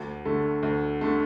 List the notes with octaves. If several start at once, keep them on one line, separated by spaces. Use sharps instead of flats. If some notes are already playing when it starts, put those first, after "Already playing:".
Already playing: D2
D3 A3
D2
D3 A3